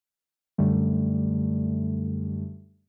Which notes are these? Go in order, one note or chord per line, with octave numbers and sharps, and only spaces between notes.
F#2 D3 G3 A3